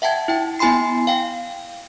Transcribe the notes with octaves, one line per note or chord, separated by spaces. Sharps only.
E5 F#5 G5 A5 G#6
E4 G5
B3 E4 G#5 B5 C6 C7
F5 G5